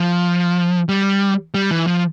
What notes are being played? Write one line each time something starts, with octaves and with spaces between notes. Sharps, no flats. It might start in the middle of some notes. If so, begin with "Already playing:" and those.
Already playing: F3
G3
G3
E3
F3